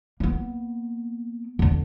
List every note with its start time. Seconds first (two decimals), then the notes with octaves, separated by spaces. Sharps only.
0.20 A#3 B3
1.59 E2 D3